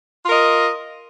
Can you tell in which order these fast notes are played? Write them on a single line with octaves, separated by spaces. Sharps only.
F4 A#4 D#5